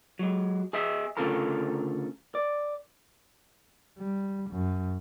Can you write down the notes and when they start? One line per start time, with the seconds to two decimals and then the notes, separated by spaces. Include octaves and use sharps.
0.19 F#3 G#3
0.73 G#4 D#5 E5
1.17 D2 C#3 F4 A4 A#4 A#5
2.35 D5
3.99 G3
4.51 F#2